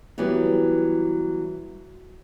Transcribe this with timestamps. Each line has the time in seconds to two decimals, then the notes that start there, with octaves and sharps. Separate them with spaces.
0.18 E3 F#3 G3 B3